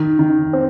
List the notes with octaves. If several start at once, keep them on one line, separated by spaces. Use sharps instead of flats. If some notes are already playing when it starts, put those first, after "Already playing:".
Already playing: D#3
D#3
C4